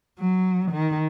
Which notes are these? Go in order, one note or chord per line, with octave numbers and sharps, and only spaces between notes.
F#3
D#3